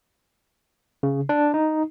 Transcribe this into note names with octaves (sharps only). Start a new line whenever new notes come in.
C#3
D4
D#4